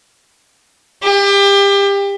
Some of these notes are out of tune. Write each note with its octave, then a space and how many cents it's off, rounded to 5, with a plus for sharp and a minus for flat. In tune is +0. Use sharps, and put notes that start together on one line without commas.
G4 +30